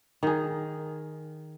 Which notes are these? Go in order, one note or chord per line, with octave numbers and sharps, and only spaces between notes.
D#3 G#4